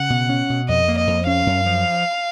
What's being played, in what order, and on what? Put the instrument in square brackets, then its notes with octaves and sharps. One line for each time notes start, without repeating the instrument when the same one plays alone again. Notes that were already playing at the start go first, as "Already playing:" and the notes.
Already playing: [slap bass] C#3 [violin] F#5
[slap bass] B2
C#4
B2
[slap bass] F2 [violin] D#5
[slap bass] A#3
[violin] D#5
[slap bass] F2
[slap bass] C#4 [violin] F5
[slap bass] F#2
F3